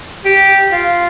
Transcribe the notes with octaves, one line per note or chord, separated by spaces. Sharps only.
G4
F4